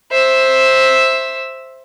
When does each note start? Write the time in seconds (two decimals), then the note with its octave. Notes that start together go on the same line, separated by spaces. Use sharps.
0.12 C5 E5